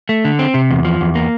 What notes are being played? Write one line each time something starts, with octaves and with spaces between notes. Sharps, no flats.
A3
D3
C4
C3
E2
F3
E2
A#3